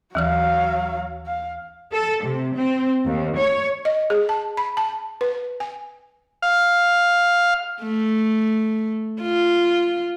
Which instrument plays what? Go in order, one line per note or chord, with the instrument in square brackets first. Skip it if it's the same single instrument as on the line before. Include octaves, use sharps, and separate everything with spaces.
[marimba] D#2 E3 F6 [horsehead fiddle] F#3 F5
[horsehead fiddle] F5
[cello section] A4
C3
C4
D#2
C#5
[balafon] D#5
G#4
A5
B5
A5
B4
G#5
[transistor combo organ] F5
[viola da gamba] A3
F4